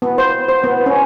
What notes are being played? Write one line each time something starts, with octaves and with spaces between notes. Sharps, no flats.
B3
C5
C5
B3
C#4